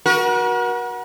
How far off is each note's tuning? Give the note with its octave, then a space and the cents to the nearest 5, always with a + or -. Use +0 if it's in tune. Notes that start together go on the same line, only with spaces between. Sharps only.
F#4 +0 A#4 +45